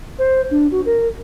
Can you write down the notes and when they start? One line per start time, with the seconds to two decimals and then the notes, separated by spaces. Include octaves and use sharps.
0.19 C5
0.51 D4
0.71 F#4
0.86 A#4